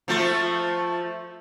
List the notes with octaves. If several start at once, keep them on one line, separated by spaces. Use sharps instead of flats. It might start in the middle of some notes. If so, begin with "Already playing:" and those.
F3 A3 F4